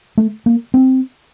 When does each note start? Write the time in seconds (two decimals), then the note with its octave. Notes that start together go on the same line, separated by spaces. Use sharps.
0.17 A3
0.46 A#3
0.74 C4